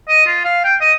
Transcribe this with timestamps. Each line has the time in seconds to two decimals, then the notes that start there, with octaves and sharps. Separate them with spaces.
0.09 D#5
0.26 F4
0.45 F5
0.65 G5
0.81 D#5